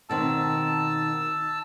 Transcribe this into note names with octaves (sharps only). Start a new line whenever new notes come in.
B2 D#3 C4 A5 E6